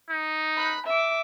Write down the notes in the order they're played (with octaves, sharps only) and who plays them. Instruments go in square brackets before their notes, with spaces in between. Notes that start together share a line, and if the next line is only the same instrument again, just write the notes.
[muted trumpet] D#4
[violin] B5 F#6
E5 D6